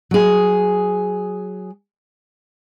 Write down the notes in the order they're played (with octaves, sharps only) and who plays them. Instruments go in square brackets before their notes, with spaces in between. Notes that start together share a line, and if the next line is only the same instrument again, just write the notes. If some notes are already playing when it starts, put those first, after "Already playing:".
[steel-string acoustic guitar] F#3 G#4